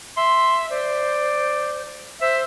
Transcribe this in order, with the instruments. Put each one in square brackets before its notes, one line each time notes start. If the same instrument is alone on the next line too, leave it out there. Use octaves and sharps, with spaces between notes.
[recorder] E5 [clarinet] C6
[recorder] C5 [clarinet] D5
[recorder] C5 [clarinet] E5